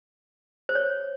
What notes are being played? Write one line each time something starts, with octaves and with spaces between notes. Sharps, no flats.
C5
C#5